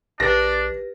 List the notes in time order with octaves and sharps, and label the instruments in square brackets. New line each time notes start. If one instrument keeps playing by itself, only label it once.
[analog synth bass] A#1 [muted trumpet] D4 [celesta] G4 A#4 B4 [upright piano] A#6